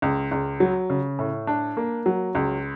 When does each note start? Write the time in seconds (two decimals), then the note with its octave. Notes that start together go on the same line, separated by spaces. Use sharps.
0.02 C#2
0.31 C#2
0.60 F#3
0.90 C#3
1.19 A2
1.47 D4
1.77 A#3
2.06 F#3
2.35 C#2